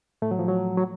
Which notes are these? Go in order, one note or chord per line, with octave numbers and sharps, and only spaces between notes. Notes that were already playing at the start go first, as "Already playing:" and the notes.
A2 A3
F#3
F3
F#3
F#3